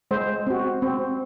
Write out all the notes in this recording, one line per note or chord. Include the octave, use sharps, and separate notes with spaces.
G#3 C5
C4 F#4
C4